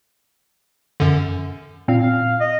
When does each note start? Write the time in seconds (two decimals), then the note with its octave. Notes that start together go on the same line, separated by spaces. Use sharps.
1.00 F#2 D3
1.88 A#2 C4 F5
2.40 D#5